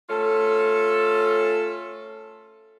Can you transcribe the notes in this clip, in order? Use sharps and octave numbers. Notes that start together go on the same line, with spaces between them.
A3 C#4 F4 A4